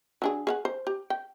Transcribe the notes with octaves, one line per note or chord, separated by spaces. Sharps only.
F#3 D4 G#4
G#4 F5 F#5
C5
G4
G5